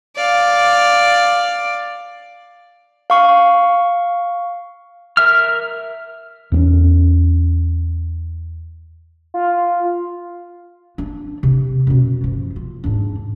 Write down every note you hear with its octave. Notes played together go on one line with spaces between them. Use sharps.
D5 F5
F5 C#6
A#4 E5 F6
E2 B3 C#4
F4
D4
C3
F#2 B2
F3
F4
G#2 D4